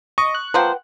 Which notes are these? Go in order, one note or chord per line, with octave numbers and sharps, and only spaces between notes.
D#5 C#6
F#6
F3 A#3 B4 C5 F#5 G5